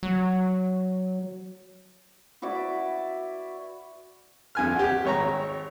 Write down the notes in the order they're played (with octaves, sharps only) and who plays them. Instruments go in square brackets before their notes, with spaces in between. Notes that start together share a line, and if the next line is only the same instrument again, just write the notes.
[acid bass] F#3
[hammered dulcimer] E4 F#4 B4 D5
[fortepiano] F2 G#5 F6
F#4 G4
G#1 C#5 A#5